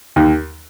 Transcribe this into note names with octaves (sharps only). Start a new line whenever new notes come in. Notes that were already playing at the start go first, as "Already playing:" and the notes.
D#2